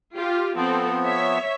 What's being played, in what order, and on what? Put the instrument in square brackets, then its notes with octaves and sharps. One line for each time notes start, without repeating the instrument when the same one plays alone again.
[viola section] F4 G4
[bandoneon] F3 B3 [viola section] C4 A4
[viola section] C#5 E5